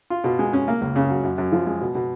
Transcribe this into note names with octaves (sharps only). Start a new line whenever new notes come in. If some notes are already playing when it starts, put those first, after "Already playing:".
F4
B2
G#3
C#4
A#3
C#2
C#3
F#3
F#2
F#2
F3
G#3
B2
B2